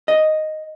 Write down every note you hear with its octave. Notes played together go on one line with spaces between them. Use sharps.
D#5